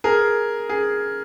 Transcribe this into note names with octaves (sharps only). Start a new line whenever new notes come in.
G#4 A#4
G#4